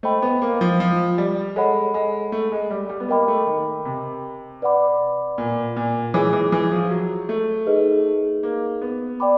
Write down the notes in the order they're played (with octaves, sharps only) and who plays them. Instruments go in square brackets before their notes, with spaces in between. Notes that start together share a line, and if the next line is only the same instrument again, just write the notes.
[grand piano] A3 [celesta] C5 D#5 G5 B5
[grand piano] B3
A#3
F3
F3
G3
[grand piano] G#3 [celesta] A4 C#5 F#5 B5
[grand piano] G#3
A3
G#3
G3
G3
B3
[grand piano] A#3 [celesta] A#4 D#5 G5 B5 D6
[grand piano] A3
D#3
C3
[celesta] B4 D5 F#5 B5 D6
[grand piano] A#2
A#2
[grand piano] E3 [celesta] F4 G#4 C#5
[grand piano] E3
E3
F3
F#3
A3
[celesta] D#4 G#4 B4 D#5
[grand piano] A#3
B3
[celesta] D5 G5 B5 D6